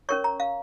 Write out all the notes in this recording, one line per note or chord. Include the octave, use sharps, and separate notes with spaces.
C#4 A#4 C#5 C#6
A#5
F5